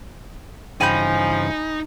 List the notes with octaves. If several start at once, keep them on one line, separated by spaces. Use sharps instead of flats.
G2 C#3 E3 F3 D#4 G#5 B5 G6